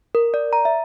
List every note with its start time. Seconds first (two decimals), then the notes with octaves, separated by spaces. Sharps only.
0.15 A#4
0.34 D5
0.53 A#5
0.65 E5